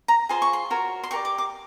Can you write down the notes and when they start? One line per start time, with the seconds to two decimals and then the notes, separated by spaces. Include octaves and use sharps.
0.08 A#5
0.29 F4 G#4 C5 C6
0.42 C#6
0.53 C6
0.70 F#4 A#4 C#5
1.04 C6
1.11 G4 A#4 D5 C#6
1.25 D6
1.38 D6